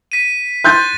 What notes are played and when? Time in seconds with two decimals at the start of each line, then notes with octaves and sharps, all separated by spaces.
0.12 B6 D#7
0.64 C6 F#6 G6 A6